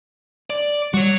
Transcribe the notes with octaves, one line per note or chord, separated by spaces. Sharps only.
D5
G3 F#4 C#5